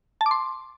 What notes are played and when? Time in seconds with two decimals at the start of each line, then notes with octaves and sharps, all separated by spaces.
0.21 A5
0.26 D6
0.31 C6